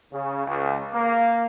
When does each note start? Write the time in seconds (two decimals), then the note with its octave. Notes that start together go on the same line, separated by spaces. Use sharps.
0.12 C#3
0.46 C#2
0.93 A#3